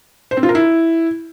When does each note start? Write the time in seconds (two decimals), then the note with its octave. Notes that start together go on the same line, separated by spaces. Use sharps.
0.31 C5
0.37 C4
0.43 F4
0.49 A#4
0.55 E4